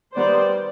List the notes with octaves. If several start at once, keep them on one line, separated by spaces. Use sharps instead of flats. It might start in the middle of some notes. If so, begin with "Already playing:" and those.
D#3 G3 B3 C5 D5